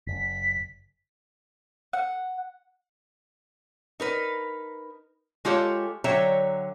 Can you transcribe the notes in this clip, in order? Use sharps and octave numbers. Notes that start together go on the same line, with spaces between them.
F#1 B6
F#5
D#4 A#4 B4
G#3 F4 G4 A4 C#5
D3 F#3 C#5 E5 G5 A#5